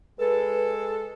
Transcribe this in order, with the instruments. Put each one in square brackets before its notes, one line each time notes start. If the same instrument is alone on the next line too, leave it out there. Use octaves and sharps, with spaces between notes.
[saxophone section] G#3 A4 [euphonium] B4